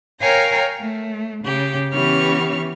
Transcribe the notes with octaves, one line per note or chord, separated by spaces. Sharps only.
A#4 C#5 F5 G5 G#5 A#5
A3
C#3 G4
E3 B3 C#4 G4 C#6 F6